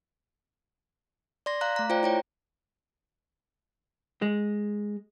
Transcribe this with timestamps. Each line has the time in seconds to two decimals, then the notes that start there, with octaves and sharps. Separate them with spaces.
1.46 D5 C6 A#6
1.61 F5 A#5 F#6
1.76 A3 A#5
1.90 F4 C5 D5 G5 A#5
2.03 E4 C#5 G5
4.22 G#3